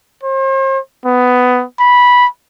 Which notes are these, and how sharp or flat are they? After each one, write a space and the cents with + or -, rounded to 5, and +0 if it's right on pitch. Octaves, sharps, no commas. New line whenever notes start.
C5 +40
B3 +15
B5 -10